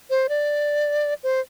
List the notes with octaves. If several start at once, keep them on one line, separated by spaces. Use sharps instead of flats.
C5
D5
C5